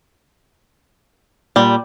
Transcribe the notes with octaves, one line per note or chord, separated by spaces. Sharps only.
A#2 G3